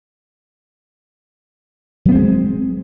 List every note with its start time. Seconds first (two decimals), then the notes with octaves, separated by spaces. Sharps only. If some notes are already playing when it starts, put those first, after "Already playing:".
2.05 F#3
2.09 B3
2.12 C4
2.15 G#3